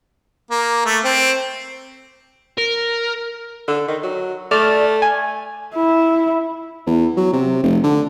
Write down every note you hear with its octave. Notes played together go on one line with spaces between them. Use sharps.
A#3
A3
C4
A#4
D3
D#3
F#3
A3 D5 F6
G#5
E4
E2
F#3
C3
F1
D3